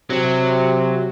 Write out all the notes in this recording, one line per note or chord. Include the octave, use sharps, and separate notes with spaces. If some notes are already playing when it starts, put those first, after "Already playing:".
C3 F#3